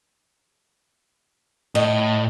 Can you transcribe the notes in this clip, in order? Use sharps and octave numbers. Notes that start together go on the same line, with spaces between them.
A2 D#5